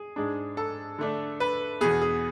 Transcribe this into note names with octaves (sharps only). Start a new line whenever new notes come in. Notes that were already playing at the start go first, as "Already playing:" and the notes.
Already playing: G#4
G#2 G#3 D4
A4
D3 A3 D4
B4
E2 B2 B3 G#4
G#4